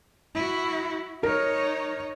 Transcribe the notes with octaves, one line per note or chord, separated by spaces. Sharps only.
E4 F#4
D#4 A#4 C#5